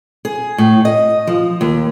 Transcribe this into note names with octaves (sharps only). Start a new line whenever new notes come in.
G#4
A2
D#5
F3
D#2